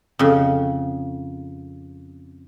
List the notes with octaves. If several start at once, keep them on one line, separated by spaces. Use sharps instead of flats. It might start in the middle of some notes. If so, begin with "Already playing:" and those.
F2 C#3